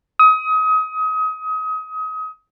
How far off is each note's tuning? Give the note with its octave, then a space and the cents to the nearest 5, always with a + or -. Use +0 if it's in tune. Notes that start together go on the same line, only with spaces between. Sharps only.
D#6 +30